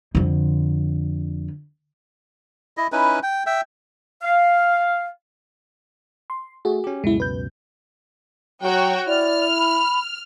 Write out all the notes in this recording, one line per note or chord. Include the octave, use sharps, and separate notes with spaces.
F2 D3
E4 D#5
C#4 D#4 E4 B4
G5
E5 G5
F5
C6
A3 F#4 G#4
C#4 G4
C#2 F#2 B2 G#3 E4
B4 G6
F#3 F#4 C#5 G5
E4 D5 F6
B5